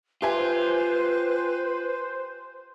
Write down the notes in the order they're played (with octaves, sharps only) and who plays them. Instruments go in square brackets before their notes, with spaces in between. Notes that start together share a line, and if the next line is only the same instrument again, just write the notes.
[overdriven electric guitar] F4 [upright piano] G4 E5 G#5 [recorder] B4 [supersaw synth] C5